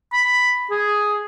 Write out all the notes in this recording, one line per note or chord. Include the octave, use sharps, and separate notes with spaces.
B5
G#4